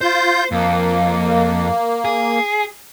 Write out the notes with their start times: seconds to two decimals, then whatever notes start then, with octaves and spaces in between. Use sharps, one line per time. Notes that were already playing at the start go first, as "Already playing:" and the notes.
0.01 F4 C5 G6
0.52 F2 A#3
2.05 G#4